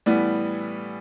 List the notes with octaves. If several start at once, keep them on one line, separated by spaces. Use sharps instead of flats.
A2 E3 G3 B3